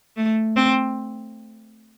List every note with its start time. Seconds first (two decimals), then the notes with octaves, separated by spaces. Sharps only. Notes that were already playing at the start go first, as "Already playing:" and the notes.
0.17 A3
0.56 C4